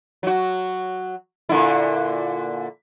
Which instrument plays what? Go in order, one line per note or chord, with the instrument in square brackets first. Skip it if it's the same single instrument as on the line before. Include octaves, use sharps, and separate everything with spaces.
[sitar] F#3 F#4
A#2 D3 E4